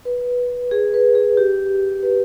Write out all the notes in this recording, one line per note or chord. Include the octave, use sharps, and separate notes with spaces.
B4
G#4
B4
G#4
G4
B4